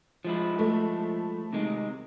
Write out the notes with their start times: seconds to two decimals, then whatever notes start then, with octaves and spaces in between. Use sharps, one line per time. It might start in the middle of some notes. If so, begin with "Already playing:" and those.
0.25 F3 G#3 E4
0.59 A3
1.53 C3 D#3 G#3